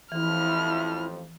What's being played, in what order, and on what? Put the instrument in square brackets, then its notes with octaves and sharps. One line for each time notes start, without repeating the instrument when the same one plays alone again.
[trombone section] A1 F2 F3 [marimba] E3 [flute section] E4 [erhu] F6